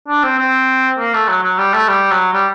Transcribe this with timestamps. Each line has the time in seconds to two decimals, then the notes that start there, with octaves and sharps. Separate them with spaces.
0.08 D4
0.23 C4
0.38 C4
0.98 A#3
1.13 A3
1.28 F#3
1.43 F#3
1.58 G3
1.73 A3
1.88 G3
2.11 F#3
2.33 G3